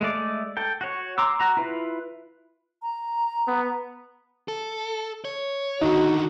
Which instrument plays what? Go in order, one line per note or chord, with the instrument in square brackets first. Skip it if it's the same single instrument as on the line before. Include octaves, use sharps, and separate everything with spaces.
[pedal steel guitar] G#3 A3 D5
A4 G5
F#4 C#5
A#5 C6 D6 E6
F#4 A#5
E4 F4 B4
[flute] A#5
[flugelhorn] B3
[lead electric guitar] A4
C#5
[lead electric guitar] D3 D#3 [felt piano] D#4 [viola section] F#4